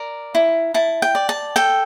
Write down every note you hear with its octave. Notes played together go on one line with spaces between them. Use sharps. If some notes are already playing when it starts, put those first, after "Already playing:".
Already playing: A#4 D5
E4
E4 A5
G5
D5
A5
A4 G5